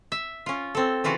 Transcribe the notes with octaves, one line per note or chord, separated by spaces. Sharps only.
E5
C#4 F4
C4 A4
C#3 E3 F4 F#4